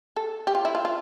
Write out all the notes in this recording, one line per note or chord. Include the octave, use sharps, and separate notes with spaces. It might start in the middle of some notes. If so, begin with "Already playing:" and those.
A4
G4
F4
E4
F4
F4